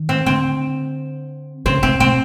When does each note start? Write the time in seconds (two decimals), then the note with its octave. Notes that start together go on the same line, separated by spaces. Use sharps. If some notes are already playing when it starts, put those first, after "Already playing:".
Already playing: D#3
0.09 C4
0.26 D3 C4
1.66 C#3 C4
1.83 C3 C4
2.00 B2 C4